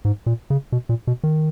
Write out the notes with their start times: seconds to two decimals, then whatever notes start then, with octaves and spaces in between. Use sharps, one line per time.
0.05 G#2
0.26 A#2
0.50 C#3
0.72 B2
0.89 A#2
1.07 B2
1.24 D#3